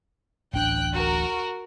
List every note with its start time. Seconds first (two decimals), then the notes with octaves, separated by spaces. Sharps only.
0.53 D1 A1 D4 G5 F#6
0.92 F#4 A#4